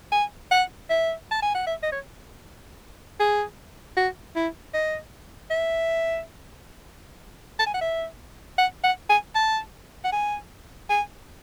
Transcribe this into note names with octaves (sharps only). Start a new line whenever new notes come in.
G#5
F#5
E5
A5
G#5
F#5
E5
D#5
C#5
G#4
F#4
E4
D#5
E5
A5
G#5
F#5
E5
F#5
F#5
G#5
A5
F#5
G#5
G#5